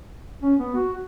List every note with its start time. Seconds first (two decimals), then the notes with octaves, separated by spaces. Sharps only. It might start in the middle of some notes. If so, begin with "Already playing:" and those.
0.42 C#4
0.59 B3
0.75 F#4